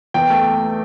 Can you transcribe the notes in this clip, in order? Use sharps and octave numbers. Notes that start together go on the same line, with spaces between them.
E2 G5
A3